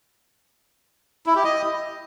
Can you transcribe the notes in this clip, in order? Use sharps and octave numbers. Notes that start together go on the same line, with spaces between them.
E4
G4
D#5